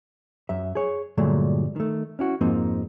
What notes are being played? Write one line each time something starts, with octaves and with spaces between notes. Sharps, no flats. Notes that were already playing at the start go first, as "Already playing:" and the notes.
F#2 E5
G#4 C#5
G2 A#2 D3 F#3 G#3 A3
D#3 A3
C#4 E4 F#4
F2 G#2 F3 A#3 C4 D#4